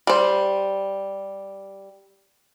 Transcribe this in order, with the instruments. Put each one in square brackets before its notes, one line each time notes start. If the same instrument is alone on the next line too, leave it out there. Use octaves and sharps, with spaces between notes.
[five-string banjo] G3 C5